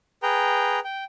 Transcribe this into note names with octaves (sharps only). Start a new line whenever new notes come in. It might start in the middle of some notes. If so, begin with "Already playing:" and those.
G#4 B4 G5 A#5
G5